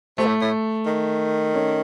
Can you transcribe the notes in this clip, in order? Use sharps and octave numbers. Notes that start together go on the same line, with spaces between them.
C3 A3
A2
A2
D#3
A3 C#4